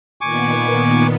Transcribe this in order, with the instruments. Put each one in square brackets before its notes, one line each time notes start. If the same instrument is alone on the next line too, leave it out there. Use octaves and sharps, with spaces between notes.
[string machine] A#2 D#3 B3 [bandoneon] G#5 C#6 D6